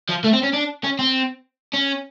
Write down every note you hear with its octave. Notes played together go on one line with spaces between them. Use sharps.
F3
A3
C4
C#4
D4
C#4
C4
C#4